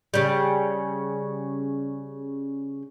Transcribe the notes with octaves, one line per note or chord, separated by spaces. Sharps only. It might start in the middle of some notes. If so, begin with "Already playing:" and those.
C#3 G3